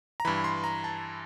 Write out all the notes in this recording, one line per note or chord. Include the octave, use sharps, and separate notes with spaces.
A#5
G2 E3 B5
C6
A#5
A5